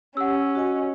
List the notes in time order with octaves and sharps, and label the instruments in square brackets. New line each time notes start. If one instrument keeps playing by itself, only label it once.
[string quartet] C#4 [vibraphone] G4 [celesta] F#5 E6
[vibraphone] F#4 D#5 G#5